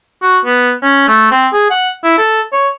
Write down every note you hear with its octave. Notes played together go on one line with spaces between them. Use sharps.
F#4
B3
C#4
A3
C4
G#4
F#5
E4
A4
C#5